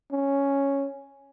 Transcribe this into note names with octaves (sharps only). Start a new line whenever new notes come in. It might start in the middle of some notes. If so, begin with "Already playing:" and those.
C#4